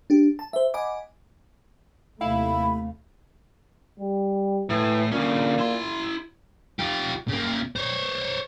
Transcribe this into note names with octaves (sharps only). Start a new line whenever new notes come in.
D4 G4
A5
C5 E5
D#5 F#5 G#5 B5 D6
D#2 C3 A3 E4 F5 B5
G3
A2 E3
A#2 D3 C#4
E4 C6
F4 G4
C#3 A#3
C5 C#5